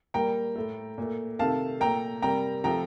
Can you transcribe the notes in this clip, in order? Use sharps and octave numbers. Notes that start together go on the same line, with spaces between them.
A#2 G3 A#3 G5 A#5
A2 A3
A#2 A3
C3 D#3 A3 F5 A5
A#2 A3 G5 A#5
C3 G3 A#3 G5 A#5
C3 F3 A3 G5 A#5